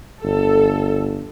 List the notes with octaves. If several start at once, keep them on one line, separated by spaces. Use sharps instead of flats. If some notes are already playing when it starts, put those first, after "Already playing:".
G1 A4